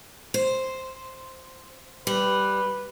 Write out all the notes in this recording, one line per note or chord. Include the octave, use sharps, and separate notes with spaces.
C5
G3 B4